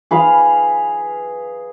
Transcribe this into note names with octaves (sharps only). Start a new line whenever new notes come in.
G#4 B4 F5